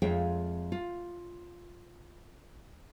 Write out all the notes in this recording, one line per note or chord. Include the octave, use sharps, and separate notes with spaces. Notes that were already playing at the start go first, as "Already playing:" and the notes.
F2 G#3 F4 C#5 E5 G5
F4